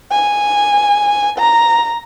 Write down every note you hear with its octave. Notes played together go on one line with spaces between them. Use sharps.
G#5
A#5